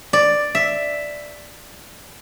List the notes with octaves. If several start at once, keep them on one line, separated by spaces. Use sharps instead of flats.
D5
E5